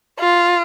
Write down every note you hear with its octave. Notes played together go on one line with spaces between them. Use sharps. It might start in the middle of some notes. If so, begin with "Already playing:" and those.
F4